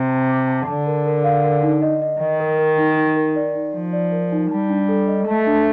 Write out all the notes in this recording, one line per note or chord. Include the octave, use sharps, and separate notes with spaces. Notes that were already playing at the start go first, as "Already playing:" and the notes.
Already playing: C3
A5
D6
A5
D3 A5
A#4
A#4
F5
A#4
D#4
D#5
D#5
D#3 D#5
A#4
A#4
D#4
D#4
A#4
D5
D#4
F3 D#4
D5
A#4
D#4
G3 A5
D4
A4
D#5
A3 A5
D4